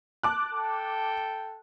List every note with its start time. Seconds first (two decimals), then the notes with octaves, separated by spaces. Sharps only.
0.23 A5 D6 F#6
0.53 A4 G5